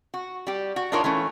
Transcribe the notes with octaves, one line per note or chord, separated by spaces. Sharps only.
F#4
G3 G4
F#4
D4 D#4 F4 A#4 C#5
E3 A3 C#4